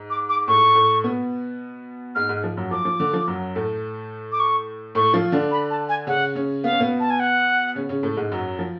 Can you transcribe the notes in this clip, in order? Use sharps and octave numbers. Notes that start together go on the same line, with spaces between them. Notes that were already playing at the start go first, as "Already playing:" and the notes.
Already playing: G#2
D6
D6
A2 A3 C#6
A2 A3
B2 B3
G#2 G#3 F6
G#2 G#3
F3
F#2 F#3
F3 D6
F3
D3
F3
F#2 F#3
A2 A3
D6
C#6
A2 A3 C#6
F3 F4
D3 D4
B5
A5
G#5
C#3 C#4 F#5
C#3 C#4
B3 F5
C#4
B2 B3
A5
G#5
F#5
C#3 C#4
C#3 C#4
A2 A3
G#2 G#3
F#2 F#3
F3